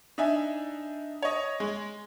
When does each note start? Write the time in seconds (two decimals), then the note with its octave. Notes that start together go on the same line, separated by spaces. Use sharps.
0.18 D4 D#4 E5 G#5
1.22 C#5 D#5
1.60 G#3